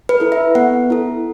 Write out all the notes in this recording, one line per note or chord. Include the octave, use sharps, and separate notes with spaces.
B4
E4 A4
E5
B3 F#5
E4 A4